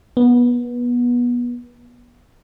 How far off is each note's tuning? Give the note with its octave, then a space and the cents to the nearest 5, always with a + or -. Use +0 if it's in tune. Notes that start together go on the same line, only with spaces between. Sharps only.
B3 -25